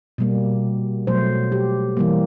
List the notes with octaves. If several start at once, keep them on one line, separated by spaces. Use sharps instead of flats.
B2 G3 A#3
B2 F#3 A3 C5
G4
E3 G3 A#3